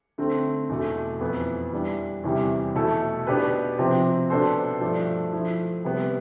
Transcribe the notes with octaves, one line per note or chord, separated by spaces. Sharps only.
D3 A3 C4
E2 B2 A3
F2 E3 B3
E3 G3 D4
E2 C3 E3 G3
B2 A3 E4 A4
B2 B3 D4 G4 B4
C3 F3 C4
B2 B3 D4 A4 C5
G2 F3 A3 D4 A4
F3 A3 E4
C3 G3 B3